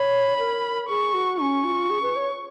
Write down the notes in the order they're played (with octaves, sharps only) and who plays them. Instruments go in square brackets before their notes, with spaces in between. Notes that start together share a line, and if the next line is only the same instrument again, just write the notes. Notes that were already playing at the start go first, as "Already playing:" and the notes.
Already playing: [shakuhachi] C#5 [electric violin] B5
[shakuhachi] A#4
[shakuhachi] G#4 [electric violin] C#6
[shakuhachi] F#4
[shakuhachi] C#4 [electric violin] C#6
[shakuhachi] F4
G#4
B4
C#5